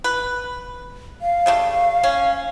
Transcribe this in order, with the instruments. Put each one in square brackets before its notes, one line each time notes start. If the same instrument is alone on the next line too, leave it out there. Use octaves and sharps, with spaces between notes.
[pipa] B4
[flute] F5
[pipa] C#3 G3 A3
C#4